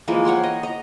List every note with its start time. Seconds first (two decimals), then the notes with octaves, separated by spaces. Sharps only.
0.08 E3 F3 G#3 A#3
0.25 C#5 F#5 G5 C6
0.44 D#5
0.63 D#5 A#5